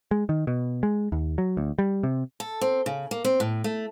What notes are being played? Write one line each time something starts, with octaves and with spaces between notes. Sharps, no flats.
G#3
D#3
B2
G#3
D#2
F#3
D2
G3
C3
A4
C4
C#3
A#3
C4
A2
A3